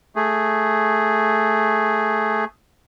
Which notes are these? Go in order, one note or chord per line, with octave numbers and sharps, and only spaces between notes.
A3 G#4